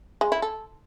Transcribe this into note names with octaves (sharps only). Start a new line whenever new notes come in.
G#3
E4
A4